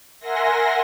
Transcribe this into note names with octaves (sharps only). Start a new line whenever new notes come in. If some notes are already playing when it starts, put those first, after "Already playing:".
A#4 E5 F#5 G#5 C6 A#6